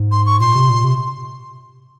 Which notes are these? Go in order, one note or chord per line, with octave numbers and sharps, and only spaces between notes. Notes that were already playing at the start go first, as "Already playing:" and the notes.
Already playing: G#2
C6
C#6
A#2 C6
C3
A#2
C3